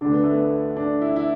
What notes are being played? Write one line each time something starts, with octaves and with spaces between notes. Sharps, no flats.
D2 D3 D4
B3
A3
B3
D4
E4
E4